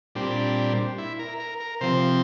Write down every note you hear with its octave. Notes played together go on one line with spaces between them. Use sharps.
A#2 G3 C4 D4
E4
A#4
A#4
A#4
C3 F3 C4 C5